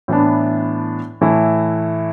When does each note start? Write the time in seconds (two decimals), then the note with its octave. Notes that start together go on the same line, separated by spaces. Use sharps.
0.08 A2 E3 B3 D4
1.21 A2 E3 A3 E4